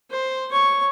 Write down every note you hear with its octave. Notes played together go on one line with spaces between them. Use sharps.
C5
C#5 C#6